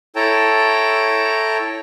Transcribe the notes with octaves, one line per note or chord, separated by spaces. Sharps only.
E4 A4 C#5 G5 A5 A#5